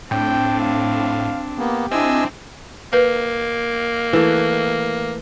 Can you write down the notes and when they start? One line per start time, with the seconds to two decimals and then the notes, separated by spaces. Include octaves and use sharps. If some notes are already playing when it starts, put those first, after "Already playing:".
0.11 A2 C4 D4 G5
0.61 F5
1.58 A#3 B3 G4
1.91 C4 D4 E4 D#5 G#5 E6
2.93 A#3 B4
4.13 E3 A3